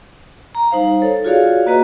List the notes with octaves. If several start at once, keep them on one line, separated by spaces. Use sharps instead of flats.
A#5
G3 D#4 C5 F5
A4 C#5
F4 F#4 G#4 C#5 D5 F5
A#3 F#4 B4 D#5 A#5